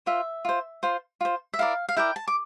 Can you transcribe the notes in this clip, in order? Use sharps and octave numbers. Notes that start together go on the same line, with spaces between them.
F4 C5 E5
F4 C5
F4 C5
F4 C5
E5
E4 A#4 D5 F5
F5
E4 A#4 D5 G5
A5
D6